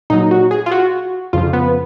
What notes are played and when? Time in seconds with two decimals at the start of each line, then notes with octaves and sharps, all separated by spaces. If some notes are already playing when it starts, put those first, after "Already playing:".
0.10 A#2 F#3 D#4
0.31 F#4
0.51 G#4
0.66 F4
0.71 F#4
1.33 F2 C#3 F3 F4
1.53 B3